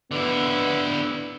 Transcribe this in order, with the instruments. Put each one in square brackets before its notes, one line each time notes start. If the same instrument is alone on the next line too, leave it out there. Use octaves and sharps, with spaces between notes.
[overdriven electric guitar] D3 E4 [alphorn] B3